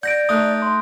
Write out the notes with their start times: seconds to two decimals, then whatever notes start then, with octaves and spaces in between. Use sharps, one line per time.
0.03 D5 F#5 G6 A#6 D7
0.29 A3 D#4 D#6 F#6
0.62 C6